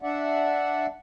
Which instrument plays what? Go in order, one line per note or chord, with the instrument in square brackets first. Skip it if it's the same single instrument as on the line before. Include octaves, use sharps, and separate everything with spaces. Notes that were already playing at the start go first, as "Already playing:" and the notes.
[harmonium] D4 D5 E5 F#5